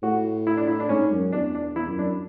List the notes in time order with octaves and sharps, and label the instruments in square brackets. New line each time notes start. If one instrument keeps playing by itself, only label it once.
[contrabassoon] A2 [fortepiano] F#4
[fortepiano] E4
D4
E4
D4
[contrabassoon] G#2 [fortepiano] C#4
[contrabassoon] F#2
[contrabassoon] E2 [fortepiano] D4
[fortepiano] D4
[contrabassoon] E2 [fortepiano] E4
[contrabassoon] F#2
[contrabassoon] F#2 [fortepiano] D4